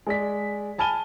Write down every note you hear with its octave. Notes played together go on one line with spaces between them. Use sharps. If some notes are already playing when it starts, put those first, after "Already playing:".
G#3 D5 B6
G#5 A5 B5 F6 D#7 G7